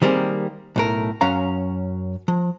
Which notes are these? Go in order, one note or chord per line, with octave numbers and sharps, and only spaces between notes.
D#3 G3 A#3 C4 G#4
B1 A2 A#4
F#2 F#3 C#4 F5 A#5
F3